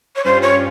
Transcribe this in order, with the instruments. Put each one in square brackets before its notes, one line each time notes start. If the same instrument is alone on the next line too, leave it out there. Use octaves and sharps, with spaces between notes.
[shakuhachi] C#5
[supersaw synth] G2 G3 C#4 F4 [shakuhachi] C5
[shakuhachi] C#5